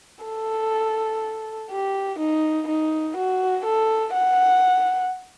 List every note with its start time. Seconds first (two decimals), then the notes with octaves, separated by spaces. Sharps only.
0.25 A4
1.71 G4
2.20 D#4
2.68 D#4
3.17 F#4
3.65 A4
4.14 F#5